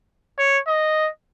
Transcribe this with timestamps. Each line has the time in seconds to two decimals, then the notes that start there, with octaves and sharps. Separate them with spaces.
0.38 C#5
0.68 D#5